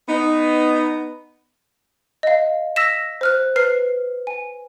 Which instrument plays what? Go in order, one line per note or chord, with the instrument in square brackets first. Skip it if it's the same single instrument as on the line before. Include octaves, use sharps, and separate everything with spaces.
[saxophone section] B3 D#4
[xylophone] D#5 F5
E6 A#6 B6 E7
C5 F6 F#6
B4 F6 C7
G#5